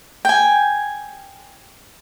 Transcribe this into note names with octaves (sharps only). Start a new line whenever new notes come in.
G5 G#5